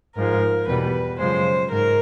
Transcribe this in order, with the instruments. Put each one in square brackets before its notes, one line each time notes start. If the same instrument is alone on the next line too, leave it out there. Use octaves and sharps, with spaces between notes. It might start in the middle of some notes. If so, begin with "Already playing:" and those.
[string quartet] G#2 F3 G#3 A#4
E2 B2 G3 B4
F#2 C#3 F3 G#3 C5
G#2 A#4